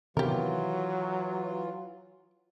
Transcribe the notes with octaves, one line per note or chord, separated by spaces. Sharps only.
C3 D#3 E3 F#3 B3 F4 G4 A#4